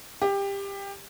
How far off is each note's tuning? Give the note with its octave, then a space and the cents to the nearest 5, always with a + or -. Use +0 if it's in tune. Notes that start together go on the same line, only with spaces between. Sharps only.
G4 +20